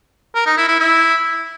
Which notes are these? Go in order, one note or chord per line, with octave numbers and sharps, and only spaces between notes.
A#4
D#4
E4
E4
E4